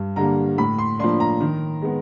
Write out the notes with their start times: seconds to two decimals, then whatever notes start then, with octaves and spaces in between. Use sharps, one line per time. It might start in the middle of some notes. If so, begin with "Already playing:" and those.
Already playing: G2
0.16 D3 G3 A#3 A#5
0.58 A2 B5
0.79 C6
0.99 F3 A#3 D4 C6
1.20 A#5
1.40 D#3
1.82 G#3 B3